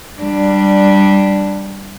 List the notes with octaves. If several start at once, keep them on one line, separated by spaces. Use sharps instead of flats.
G3 D4